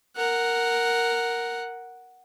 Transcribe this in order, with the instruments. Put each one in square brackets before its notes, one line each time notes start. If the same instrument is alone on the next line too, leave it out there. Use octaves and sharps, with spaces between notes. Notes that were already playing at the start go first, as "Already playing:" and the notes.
[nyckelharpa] A#4 F#5